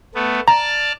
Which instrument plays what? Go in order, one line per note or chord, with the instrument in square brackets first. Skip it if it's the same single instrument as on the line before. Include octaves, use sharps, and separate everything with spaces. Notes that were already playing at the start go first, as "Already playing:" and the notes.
[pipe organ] A3 B3
[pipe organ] D5 A5 F6 [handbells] A#5